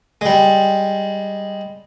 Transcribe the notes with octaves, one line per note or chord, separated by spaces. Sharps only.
G3 G#3